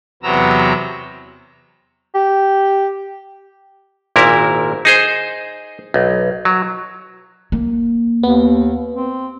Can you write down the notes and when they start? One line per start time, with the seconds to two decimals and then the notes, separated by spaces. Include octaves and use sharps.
0.23 E2 C3 F#3 B3 A#5 E6
2.15 G4
4.16 G#1 A#2 E4 A#4
4.85 D#4 G#4 C5
5.94 B1
6.45 F#3
7.52 A#3
8.23 D#2 B3
8.93 C4